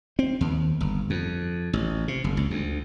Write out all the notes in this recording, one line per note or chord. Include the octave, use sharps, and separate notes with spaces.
C4
D#2
G1
F2
A1
C3
F#1
C#2
D2